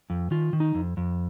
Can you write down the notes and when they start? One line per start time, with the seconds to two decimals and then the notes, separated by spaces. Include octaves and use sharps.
0.10 F2
0.31 D#3 F4
0.53 D#3
0.60 D#4
0.75 F2
0.97 F2